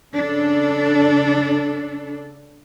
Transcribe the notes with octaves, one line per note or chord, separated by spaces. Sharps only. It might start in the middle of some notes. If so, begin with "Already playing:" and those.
C#3 D4 A4